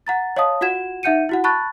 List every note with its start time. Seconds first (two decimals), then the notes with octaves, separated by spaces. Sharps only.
0.07 F#5 A#5 A6
0.36 C#5 D#5 F5 A5 D#6
0.61 F4 F#4 F#5 G#6 E7
1.03 D#4 E5 F#5 G6 C#7 D#7
1.29 E4 F#4 F#5
1.44 A5 B5 C#6 F#6 A6